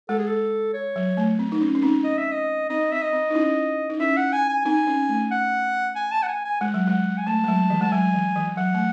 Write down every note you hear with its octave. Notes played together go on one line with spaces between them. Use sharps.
G#3 A4
G#4
A4
C#5
F#3
A3
C4
D#4
C#4
C#4
C4 D#4
D#5
E5
D#5
C4 D#4 D#5
C4 E5
D#5
C4
D#4
C#4 E4
D#4
C#4 E4 E5
F#5
G#5
G#5
C4 D#4 G#5
C#4
A3
F#5
G#5
A5
F#5
G#5
G#5
G#3 F#5
F#3
G#3
G#5
A3 A5
G#3
F#3
E3
G#3 A5
F#3 G#5
E3
E3
F#3 F#5
A3